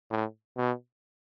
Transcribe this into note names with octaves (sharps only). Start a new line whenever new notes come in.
A2
B2